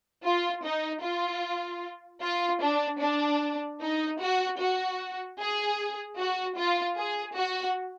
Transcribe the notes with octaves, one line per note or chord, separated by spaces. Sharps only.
F4
D#4
F4
F4
D4
D4
D#4
F#4
F#4
G#4
F#4
F4
G#4
F#4